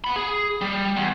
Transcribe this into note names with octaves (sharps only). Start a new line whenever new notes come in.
F#5 B5
G#4
G3
E2